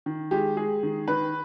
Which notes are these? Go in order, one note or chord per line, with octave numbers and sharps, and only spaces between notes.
D#3
G#3 G4
G#3 G#4
D#3
D#3 B4